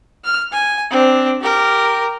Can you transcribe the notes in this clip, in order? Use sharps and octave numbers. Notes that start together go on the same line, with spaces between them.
F6
G#5
C4 D4
G4 A#4